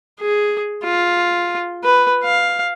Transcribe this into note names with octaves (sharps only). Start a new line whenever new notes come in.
G#4
F4
B4
F5